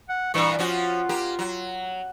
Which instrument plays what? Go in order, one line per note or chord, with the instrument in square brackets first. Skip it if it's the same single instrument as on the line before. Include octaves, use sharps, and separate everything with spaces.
[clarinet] F#5
[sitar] G2 A#2 E3 [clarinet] C#6
[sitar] F3 C#4 F#4 [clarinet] F4
[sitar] A#3 G4
F#3